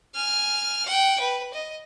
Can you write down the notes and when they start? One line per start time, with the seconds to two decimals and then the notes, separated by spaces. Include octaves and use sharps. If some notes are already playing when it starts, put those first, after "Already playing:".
0.15 G#5 F6
0.85 F#5 G5
1.20 B4
1.53 D#5